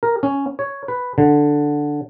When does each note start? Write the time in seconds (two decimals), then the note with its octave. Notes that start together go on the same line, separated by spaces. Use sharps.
0.03 A#4
0.23 C#4
0.59 C#5
0.88 B4
1.18 D3